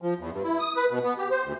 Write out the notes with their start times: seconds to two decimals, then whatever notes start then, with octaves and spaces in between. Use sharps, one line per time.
0.02 F3
0.19 E2
0.32 G2
0.44 E4
0.59 D#6
0.76 B4
0.90 B2
1.03 B3
1.18 G4
1.31 C5
1.44 D2